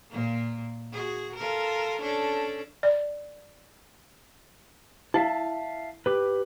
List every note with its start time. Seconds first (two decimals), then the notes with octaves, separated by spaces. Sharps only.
0.11 A#2 A#3
0.93 F#4 G#4
1.36 F4 A4 A#4
2.01 C#4 D4 A4
2.83 D5
5.14 E4 E5 F5 A5
6.06 G4 B4